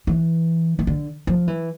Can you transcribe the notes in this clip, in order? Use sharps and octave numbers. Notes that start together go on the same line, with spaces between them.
E3
E3
D3
F3
E3